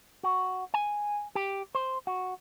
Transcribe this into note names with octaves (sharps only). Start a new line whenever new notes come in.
F#4
G#5
G4
C5
F#4